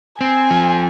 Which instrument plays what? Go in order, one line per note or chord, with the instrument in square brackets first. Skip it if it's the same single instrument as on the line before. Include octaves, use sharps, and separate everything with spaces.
[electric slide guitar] C4 [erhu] G#5
[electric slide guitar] F3